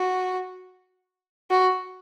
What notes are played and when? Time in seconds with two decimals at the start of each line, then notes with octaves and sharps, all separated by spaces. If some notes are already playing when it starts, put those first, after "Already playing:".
Already playing: F#4
1.50 F#4